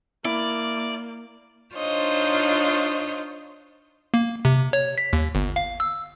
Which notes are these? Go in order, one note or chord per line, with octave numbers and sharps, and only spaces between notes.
A#3 E4 D5
D4 D#4 F4 C5 C#5 D#5
A#3
C3
C#5
B6
D#2
G1
F5
E6